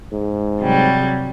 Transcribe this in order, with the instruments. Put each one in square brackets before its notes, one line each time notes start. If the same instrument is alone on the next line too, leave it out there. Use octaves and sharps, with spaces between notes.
[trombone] G#2
[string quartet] C3 F#3 G3